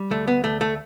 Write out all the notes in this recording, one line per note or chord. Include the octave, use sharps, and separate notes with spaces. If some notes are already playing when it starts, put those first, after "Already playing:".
Already playing: G3
D2 A3
B3
D2 A3
A3